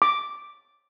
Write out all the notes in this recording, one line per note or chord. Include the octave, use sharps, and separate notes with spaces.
D6